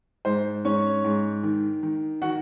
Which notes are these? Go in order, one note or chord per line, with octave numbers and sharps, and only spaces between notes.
G#2 C5
G#2 C#4 C#5
G#2
D#3
D#3
D#3 F#4 F#5